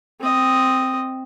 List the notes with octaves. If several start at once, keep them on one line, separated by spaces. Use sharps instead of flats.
C4 D#5